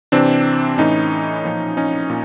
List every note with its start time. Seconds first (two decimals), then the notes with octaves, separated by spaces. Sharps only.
0.12 C3 E3 C4 D4
0.78 A2 E3 C#4 D#4
1.44 A#2 F3
1.77 C#4 D#4
2.10 A#2